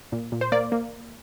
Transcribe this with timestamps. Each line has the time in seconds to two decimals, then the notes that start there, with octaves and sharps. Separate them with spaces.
0.12 A#2
0.32 A#2
0.41 C5
0.52 A#3 D5
0.72 A#3